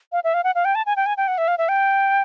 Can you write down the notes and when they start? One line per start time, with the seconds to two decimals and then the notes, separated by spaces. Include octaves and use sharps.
0.12 F5
0.24 E5
0.34 F5
0.44 F#5
0.55 F5
0.65 G5
0.75 A5
0.86 G#5
0.96 G5
1.06 G#5
1.17 G5
1.28 F#5
1.38 E5
1.48 F5
1.58 E5
1.69 G5